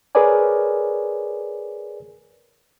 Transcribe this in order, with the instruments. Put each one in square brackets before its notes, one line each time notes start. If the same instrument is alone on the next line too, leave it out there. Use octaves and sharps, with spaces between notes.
[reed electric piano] G#4 A#4 B4 C#5 D5 G#5